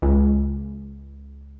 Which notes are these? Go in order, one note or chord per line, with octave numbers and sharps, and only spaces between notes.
C#2